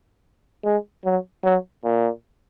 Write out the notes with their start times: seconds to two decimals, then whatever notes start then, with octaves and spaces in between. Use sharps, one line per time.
0.65 G#3
1.05 F#3
1.44 F#3
1.84 A#2